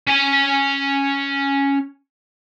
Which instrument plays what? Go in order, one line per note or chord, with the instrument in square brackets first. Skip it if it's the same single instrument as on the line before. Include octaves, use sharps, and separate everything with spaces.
[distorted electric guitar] C#4 G#5